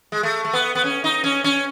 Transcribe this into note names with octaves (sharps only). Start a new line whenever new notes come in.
G#3
A3
A3
B3
B3
C#4
D#4
C#4
C#4